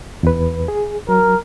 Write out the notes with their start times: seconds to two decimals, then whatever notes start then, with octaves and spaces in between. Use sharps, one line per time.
0.23 E2 B4
0.68 G#4
1.09 F#3 A#4